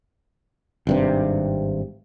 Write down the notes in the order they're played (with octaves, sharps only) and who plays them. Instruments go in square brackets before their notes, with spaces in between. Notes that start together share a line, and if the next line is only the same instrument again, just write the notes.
[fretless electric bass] G#1 G2 C3